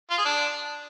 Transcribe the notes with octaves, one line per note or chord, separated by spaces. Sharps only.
F4
G#4
D4